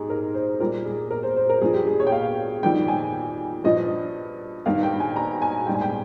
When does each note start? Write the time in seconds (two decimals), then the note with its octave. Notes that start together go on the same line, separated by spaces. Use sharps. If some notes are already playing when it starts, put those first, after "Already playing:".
Already playing: G#2 G4 G#4
0.10 A#4
0.34 C5
0.60 A#2 G3 A#4
0.85 G#4
1.10 A#4
1.23 C5
1.36 C5
1.49 A#4
1.61 G2 F3 G#4
1.74 G4
1.87 G#4
2.00 C#5
2.07 G5
2.12 F5
2.63 F2 D#3 G3 G5
2.88 G#5
3.64 G2 F3 D#5
4.66 G2 D#3 G3 F5
4.83 G5
5.00 G#5
5.16 A#5
5.42 G#5
5.67 G#2 G3 G5
5.74 G#5
5.81 G5